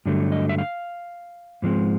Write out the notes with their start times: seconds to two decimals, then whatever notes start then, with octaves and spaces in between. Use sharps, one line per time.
0.06 G2 D3 F#3 A3
0.32 D#5
0.49 E5
0.58 F5
1.62 G#2 F3 G#3 C4